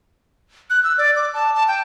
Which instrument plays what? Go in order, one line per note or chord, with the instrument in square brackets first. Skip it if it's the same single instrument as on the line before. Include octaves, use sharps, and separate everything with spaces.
[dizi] F#6
E6
D5
D6
A5
A5
G5